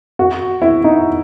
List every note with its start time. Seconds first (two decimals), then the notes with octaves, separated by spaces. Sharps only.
0.19 F#4
0.62 E4
0.84 D#4